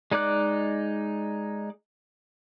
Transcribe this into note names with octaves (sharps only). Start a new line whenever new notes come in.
G#3 D#4 D5 D6 F#6